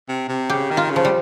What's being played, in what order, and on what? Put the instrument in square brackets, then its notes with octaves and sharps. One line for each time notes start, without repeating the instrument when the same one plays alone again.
[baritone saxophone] C3
C3
[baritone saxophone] C#3 [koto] G4
[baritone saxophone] D#3
[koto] F4
[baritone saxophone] C#3
[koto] F3
G3